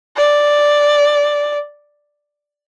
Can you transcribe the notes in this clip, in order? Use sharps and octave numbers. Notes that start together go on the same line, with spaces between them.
D5